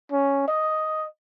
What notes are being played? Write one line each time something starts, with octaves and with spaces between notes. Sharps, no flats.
C#4
D#5